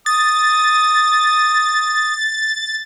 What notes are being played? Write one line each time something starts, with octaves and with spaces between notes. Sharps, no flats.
D#6 A6